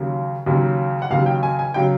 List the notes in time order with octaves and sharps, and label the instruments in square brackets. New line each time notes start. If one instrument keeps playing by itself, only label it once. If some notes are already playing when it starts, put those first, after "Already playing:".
Already playing: [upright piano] D#2 C#3 F#3
D#2 C#3 F#3
F#5
D#2 C#3 F#3 F5
G5
G#5
G#5
C#3 F#3 G5